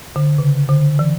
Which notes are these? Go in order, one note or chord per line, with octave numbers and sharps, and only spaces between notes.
D3
C#3
D3
E3